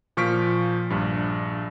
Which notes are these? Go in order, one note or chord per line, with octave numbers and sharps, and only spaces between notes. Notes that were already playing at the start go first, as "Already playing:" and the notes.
A#2 F3 C#6 F6 B6 D7
A#1 G2